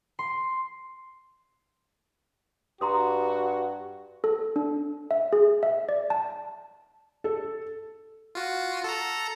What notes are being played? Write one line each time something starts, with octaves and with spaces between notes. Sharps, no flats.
C6
G2 F#4 A#5 C6 D#6
A4
D4
E5
G#4
E5
D5
A5
A4
F4 F#4
A4 A#5